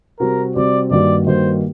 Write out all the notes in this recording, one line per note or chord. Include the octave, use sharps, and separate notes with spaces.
C3 G3 C4 F#4 A#4
C3 G3 C4 F#4 D5
G2 D#3 G3 A#3 F#4 D5
G2 D#3 G3 A#3 F#4 C5